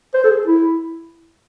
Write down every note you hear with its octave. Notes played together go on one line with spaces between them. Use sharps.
C5
A4
G#4
E4